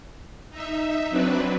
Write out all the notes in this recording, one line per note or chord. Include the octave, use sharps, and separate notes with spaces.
D#4 E5
F#3 C4 D4 B4